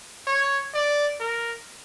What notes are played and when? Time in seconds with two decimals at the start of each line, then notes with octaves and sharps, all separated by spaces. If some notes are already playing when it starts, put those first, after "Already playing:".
0.27 C#5
0.74 D5
1.20 A#4